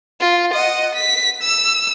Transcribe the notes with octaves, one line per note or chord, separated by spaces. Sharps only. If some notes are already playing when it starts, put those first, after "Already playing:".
F4
D#5 F#5
B6
E6